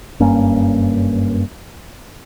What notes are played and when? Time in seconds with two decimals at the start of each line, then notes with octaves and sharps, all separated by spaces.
0.20 F#1 G2 A#3 C#4